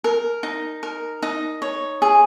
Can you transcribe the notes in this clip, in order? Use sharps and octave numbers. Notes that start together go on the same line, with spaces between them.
A#4
D#4
A#4
D#4
C#5
G#4